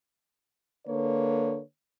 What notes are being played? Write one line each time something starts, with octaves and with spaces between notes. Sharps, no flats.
D3 A#3 B4 C#5